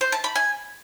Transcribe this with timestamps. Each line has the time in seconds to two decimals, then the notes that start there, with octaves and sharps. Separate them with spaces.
0.01 C5
0.12 A5
0.24 B5
0.35 G#5